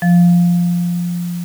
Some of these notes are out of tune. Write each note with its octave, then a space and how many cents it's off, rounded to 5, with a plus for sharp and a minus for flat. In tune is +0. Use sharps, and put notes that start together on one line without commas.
F3 +0